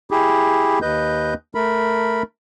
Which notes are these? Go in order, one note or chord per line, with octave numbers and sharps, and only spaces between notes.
E4 G4 G#4
D#2 B4 D#5 G6
A3 A#4 B5